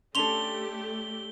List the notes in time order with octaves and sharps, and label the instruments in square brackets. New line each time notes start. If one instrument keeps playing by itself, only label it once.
[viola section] A3 G4 [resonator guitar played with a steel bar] C#4 D4 A4 [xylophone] C6 F7 [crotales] G7